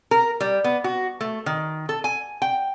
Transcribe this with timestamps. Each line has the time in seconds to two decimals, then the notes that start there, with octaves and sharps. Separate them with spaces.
0.11 A#4
0.40 G3
0.64 B3
0.84 F#4
1.21 A3
1.46 D#3
1.89 A4
2.04 G#5
2.42 G5